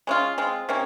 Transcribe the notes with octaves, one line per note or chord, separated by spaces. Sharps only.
G#3 C#4 F4
G#3 C4 F4
C3 D#3 A#3 C#4